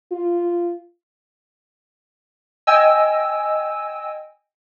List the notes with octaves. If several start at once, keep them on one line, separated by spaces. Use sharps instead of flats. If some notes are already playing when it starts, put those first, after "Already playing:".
F4
D#5 G5 G#5 E6